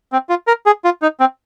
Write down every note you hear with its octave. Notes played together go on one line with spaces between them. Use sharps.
C4
F4
A#4
G#4
F4
D#4
C4